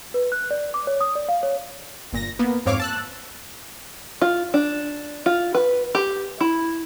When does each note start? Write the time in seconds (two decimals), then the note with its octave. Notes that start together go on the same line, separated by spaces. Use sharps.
0.14 B4
0.32 F#6
0.51 D5
0.74 D6
0.87 C#5
1.01 D#6
1.15 D5
1.29 F5
1.43 C#5
2.12 G1 A#2 A#6
2.39 A#3 B3
2.66 F2 G#2 C4 C#5 F5 D6
2.80 A5 E6 F#6
4.22 F4
4.54 D4
5.26 F4
5.55 B4
5.95 G4
6.41 E4